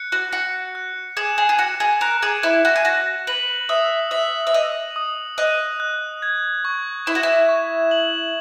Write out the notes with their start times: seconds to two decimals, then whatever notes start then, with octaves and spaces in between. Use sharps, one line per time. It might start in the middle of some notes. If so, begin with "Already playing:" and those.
Already playing: F#6 C#7
0.12 F#4
0.33 F#4 C#7
0.75 F#6
1.17 G#4 E7
1.38 G#4
1.49 G#4
1.59 F#4 C#7
1.80 G#4
2.01 A#4 F#6
2.22 G#4
2.43 E4 F#6
2.65 F#4
2.76 G#4
2.85 F#4 A#6
3.27 B4 F#7
3.69 E5 D#6
4.11 E5 F#7
4.47 E5
4.54 D#5 D#6
4.96 D#6
5.38 D#5 F#6
5.80 F#6
6.22 G#6
6.65 C#6
7.06 E4 E7
7.15 F#4
7.23 E4
7.49 C#6
7.91 F#7